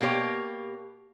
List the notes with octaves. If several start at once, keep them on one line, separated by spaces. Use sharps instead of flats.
B2 A#3 G4 C#5